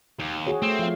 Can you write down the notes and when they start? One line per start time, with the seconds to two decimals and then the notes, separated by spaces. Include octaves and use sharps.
0.19 D#2
0.47 F#4 G#4 C#5
0.62 A3 C4
0.79 F3 F5